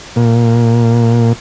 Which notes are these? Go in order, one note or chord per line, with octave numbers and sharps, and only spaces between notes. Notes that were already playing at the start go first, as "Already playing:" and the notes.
A#2